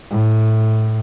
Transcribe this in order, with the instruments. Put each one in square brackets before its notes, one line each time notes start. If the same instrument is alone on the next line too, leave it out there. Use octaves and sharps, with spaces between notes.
[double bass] A2